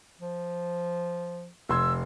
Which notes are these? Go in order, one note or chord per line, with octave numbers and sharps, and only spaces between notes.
F3
F1 C6 E6 G#6